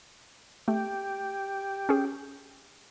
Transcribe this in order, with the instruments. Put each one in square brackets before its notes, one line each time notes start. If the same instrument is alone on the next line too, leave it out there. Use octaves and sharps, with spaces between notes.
[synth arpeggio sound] A3 [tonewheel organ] G4
[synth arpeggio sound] C#4 G#4